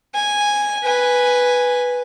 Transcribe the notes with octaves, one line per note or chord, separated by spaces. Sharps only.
G#5
B4 G#5